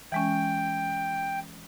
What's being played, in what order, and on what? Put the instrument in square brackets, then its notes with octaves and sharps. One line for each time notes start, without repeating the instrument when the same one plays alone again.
[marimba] E3 G#3 C#4 [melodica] G5